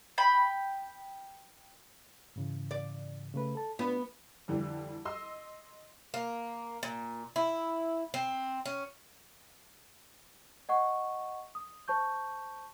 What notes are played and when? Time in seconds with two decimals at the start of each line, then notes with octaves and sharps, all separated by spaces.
0.18 G5 B5
2.36 G#2 C#3 E3
2.71 D5
3.34 C#3 A3 B4
3.55 A4 A5
3.79 B3 D4 F4
4.48 F2 D3 E3 G3
5.05 D#5 C6 E6
6.14 A#3
6.83 A#2
7.36 E4
8.14 C4
8.66 C#4
10.69 D#5 F#5 C#6
11.55 D#6
11.88 C5 A5 C#6 G6